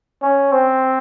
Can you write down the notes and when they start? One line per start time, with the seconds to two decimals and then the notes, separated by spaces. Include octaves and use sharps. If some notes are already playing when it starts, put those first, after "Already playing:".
0.22 C#4
0.52 C4